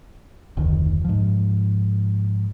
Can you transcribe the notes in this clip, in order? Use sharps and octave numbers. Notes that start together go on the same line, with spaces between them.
F1 D2 D#3
G#2 F3